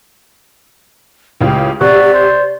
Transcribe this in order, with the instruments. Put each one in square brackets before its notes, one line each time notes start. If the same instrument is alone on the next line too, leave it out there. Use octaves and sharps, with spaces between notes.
[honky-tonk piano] C#2 A2 C#3 [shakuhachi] G4
[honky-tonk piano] C3 [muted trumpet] F#4 [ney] G4 [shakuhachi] D5
[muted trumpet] C5